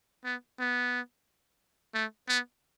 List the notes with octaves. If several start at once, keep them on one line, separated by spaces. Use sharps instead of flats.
B3
B3
A3
B3